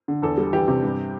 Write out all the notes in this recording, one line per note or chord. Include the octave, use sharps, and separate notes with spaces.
D3
E2 A4
G3
E3 G4
C3
G2